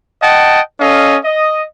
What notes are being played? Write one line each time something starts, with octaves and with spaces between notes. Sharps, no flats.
D#5 F#5 G5 A5
C#4 A4 D#5 F5
D#5